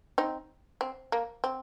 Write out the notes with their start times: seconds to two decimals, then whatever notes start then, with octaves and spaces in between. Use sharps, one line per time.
0.18 C4 D#4
0.81 C4
1.12 A#3
1.44 C4